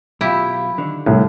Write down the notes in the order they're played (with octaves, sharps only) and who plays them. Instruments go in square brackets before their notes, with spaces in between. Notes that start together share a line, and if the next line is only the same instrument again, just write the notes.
[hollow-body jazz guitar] B1 F4 [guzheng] E4 G4
[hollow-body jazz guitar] D3 D#3
[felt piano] C2 [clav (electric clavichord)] A2